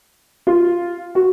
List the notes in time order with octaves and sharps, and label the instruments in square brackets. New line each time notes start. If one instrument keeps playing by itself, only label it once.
[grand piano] F4
F#4